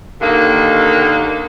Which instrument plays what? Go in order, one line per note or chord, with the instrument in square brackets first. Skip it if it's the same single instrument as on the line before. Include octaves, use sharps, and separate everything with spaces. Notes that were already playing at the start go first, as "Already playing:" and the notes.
[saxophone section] D#2 D3 D#3 A#3